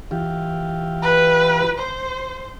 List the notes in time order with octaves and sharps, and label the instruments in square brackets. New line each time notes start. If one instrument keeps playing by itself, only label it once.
[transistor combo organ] E3 F4 G4
[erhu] B4
C5